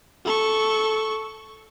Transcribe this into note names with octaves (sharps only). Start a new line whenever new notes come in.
A4 C#6